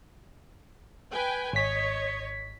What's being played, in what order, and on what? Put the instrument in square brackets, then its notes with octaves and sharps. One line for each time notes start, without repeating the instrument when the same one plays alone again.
[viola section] B4 G5 G#5
[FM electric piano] G#1 B6 [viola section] C#5 D#5